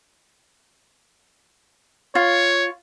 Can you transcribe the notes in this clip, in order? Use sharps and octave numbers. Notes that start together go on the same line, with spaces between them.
F4 C#5